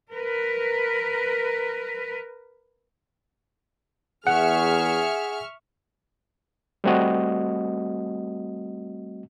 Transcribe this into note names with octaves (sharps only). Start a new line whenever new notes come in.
A#4 B4
E2 G#4 E5 F#5 C#6 F6
G3 A3 C4 F#4 D#5